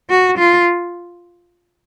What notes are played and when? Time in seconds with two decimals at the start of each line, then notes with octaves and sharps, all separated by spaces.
0.10 F#4
0.38 F4